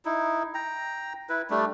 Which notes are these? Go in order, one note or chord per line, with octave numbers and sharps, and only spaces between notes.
D#4 E4
G5 A#5
E4 B4
G3 A3 D4